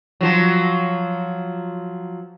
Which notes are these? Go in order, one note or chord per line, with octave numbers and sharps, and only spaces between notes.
F3 F#3